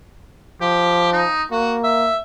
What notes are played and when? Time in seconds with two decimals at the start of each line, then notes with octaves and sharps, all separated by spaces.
0.61 F3 G4
1.12 D#4
1.51 A#3 F#4
1.83 E5